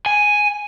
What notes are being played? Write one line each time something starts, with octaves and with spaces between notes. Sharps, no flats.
G#5